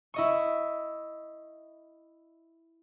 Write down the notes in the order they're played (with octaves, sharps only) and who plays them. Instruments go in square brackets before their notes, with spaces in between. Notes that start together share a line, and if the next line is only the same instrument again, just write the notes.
[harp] E4 D#5 C#6